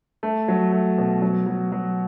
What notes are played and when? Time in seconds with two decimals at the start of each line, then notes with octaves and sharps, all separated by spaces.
0.23 A3
0.48 F#3
0.72 A3
0.98 B2
1.22 F#3
1.46 F#3
1.72 F#3